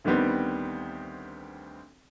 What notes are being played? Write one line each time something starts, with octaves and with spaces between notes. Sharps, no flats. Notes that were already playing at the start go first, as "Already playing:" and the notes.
D2 D#3 G3 B3 C4